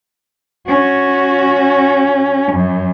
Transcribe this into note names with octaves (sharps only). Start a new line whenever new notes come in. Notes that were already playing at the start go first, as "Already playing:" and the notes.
C#4 F#4
F#2